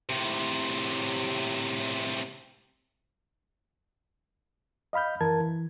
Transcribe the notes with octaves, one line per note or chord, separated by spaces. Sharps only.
A2 C3
D#5 F5 B5 F6 G6
F#2 E3 A#4 A5 G#6
E3